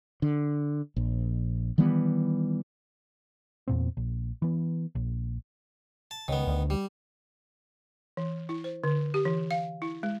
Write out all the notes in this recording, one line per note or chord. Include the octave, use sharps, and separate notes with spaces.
D3
A#1
D#3 E3 G3 B3
E2 A#2 C4
A#1
E3 B3
A#1
A5
C#2 D#3 B3
D2
G3
E3
E4
C5
D3
G4
E3
F5
E4
G#3